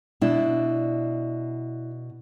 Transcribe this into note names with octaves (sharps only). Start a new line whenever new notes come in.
B2 D4 E4